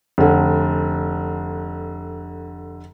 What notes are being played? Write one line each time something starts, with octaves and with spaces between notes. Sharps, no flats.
F1 D3